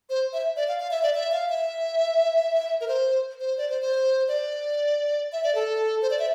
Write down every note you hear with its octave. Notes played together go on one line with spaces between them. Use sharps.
C5
E5
D5
F5
F5
E5
D5
E5
F5
E5
A#4
C5
C5
D5
C5
C5
D5
E5
D5
A4
C5
D5
E5